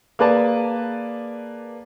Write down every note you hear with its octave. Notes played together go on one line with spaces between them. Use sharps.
A#3 G#4 B4 D5 A5